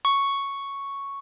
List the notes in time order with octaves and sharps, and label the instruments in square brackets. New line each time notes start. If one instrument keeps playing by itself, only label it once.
[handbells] C#6